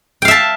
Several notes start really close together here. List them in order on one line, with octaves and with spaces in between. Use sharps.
G5 F5 E5 A5